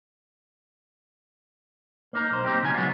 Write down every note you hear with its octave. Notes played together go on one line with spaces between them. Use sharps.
A#3 D#4 A#4
B1 C5
A#3 C4 D#4 G4
C#3 F#3 C#4 G#5
F#3 G#3 B3 F4